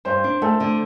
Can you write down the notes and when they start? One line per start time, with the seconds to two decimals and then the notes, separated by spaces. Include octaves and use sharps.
0.05 G2 C5
0.24 D4
0.42 A3 A4
0.60 D3